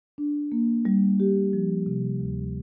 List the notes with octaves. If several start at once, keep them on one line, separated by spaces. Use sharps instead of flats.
D4
A#3
G3
G4
F3
C3
D2